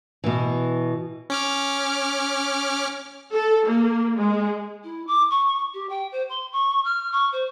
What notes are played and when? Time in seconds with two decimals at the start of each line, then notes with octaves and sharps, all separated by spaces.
0.24 B2 E3
1.30 C#4 D6 F6
3.34 A4
3.68 A#3
4.20 G#3
4.84 E4
5.07 D6
5.30 C#6
5.74 G4
5.90 G5
6.12 C5
6.29 C6
6.52 C#6
6.84 F6
7.12 C#6
7.32 C5